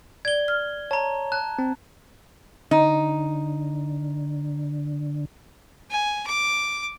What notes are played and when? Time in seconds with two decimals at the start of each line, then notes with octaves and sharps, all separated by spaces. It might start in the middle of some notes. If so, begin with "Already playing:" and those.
0.25 D5 G#6 G7
0.48 F6
0.91 C#5 A5 A#5
1.32 A5 F#6
1.59 C4
2.71 D3 D#4
5.90 G#5
6.27 D6